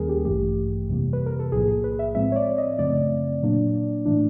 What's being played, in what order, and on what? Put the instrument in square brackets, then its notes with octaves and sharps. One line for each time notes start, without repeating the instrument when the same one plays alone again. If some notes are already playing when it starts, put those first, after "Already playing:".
Already playing: [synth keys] D#2 D#3 G3 A#3 C#4 G#4 A#4
G4
A1 G2 E3 A3 G4
F2 C3 E3 G3 A#3
B4
A#4
A4
B1 A2 F3 A#3 G#4
G#4
B4
E5
A2 F3 G#3 C4 E5
C#5
D5
D#5
F#2 C#3 F3 A3 C4 D5
A#2 F#3 A#3 D4
A2 E3 A3 D4